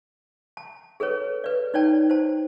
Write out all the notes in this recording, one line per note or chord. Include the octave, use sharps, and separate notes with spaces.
A5
G#4 A4 B4 C#5
B4 D5
D#4 C#5 D5 G5 A5
C5 A5